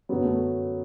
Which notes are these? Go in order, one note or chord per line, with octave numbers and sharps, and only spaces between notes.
F#2 D3 F#3 B3
A3